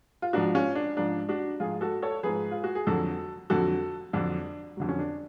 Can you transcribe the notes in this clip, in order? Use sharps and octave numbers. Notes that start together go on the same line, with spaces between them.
F4
G#2 F3 D4 F#4
C#4 F4
D4
G#2 F3 D4
D4 F#4
G#2 F3 F4 G#4
F#4 A4
A4 C#5
G#2 F3 G#4 B4
F4
F#4
G#4
F2 D3 F#3 F#4 A4
F2 D3 F#3 F#4 A4
F2 D3 F#3 D4
F2 D3 F#3
C#4
D4